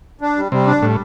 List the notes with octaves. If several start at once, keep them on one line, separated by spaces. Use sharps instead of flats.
D4
G3
C3 G3
D4
A2 G3